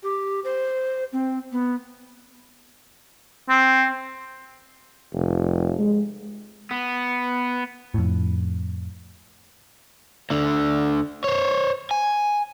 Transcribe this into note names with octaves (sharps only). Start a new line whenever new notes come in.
G4
C5
C4
B3
C4
F1
G#3
B3
F2 A2
D2 D3
C5 C#5
G#5